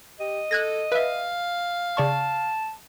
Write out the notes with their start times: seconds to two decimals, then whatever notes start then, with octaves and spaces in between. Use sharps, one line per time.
0.20 G4 D#5
0.51 A4 F#6 G#6 A#6
0.92 B4 E5 F5
1.97 C#3 D5 A5 C#6